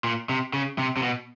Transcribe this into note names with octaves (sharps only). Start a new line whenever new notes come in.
A#2
C3
C#3
C3
C3
B2